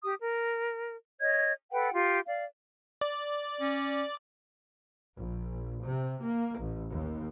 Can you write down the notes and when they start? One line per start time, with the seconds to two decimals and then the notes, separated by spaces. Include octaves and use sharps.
0.04 G4 D#6
0.21 A#4
1.21 C#5 D#5 G#6
1.72 A4 B4 F#5 G5
1.92 F4 G4
2.27 D5 F5
3.01 D5
3.61 C#4
5.15 A#1
5.85 C3
6.22 A#3
6.59 A1
6.90 D#2